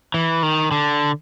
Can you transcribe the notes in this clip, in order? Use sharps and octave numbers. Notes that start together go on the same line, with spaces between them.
E3
D#3
D3